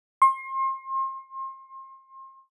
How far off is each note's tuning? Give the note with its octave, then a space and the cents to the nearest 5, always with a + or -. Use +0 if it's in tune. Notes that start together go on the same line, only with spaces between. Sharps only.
C6 +35